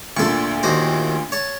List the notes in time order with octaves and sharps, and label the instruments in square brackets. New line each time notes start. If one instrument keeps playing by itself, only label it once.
[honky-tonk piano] D2 A#2 D3 [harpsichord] A4 C#6
[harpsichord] D#2 F#4 C5
C#5 A5